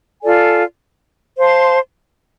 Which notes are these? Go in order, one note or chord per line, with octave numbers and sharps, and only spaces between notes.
F4 A4 D5 G#5
C5 F5 A5 C6